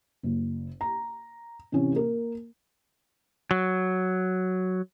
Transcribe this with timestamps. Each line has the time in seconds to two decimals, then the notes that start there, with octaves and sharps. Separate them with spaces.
0.23 F#1
0.81 A#5
1.72 C3 E3 C#4
1.93 A#3 A#4
3.51 F#3